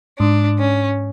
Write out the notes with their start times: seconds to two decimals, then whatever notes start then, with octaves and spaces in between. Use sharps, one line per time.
0.19 G#2 D4
0.59 C#4